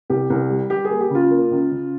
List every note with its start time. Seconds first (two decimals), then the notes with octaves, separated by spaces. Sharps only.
0.09 C2 G4
0.30 C2
0.50 G3
0.70 G3 G4
0.85 G#4
0.90 A#3
1.00 G4
1.10 C#3 F4
1.30 A#3
1.51 C#2
1.71 C#3